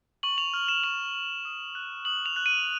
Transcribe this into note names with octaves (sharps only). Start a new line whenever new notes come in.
C#6 F#7
F7
F6
E7
C#6 F7
F6
D#6
F#6
D#6 F#7
F7
F#6
D#7